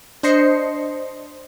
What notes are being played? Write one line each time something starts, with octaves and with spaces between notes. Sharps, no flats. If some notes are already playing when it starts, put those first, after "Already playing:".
D4 C5 D#5 C7 C#7